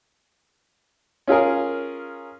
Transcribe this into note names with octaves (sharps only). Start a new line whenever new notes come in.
C#4 F4 G#4 A#4